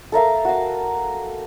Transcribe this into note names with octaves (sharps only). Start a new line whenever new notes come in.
A4 A#4 E5 F5
F#4 F5